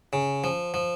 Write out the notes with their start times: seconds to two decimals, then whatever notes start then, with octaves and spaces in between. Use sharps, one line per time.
0.13 C#3
0.44 F3
0.74 F3